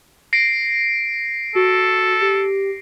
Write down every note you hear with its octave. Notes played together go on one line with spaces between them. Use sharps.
A#6 C7 D7
F#4 A4
G4